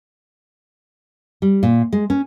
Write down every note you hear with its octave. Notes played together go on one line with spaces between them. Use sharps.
G3
A#2
G#3
C#4